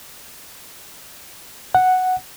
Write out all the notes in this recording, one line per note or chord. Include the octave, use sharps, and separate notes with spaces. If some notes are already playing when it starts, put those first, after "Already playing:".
F#5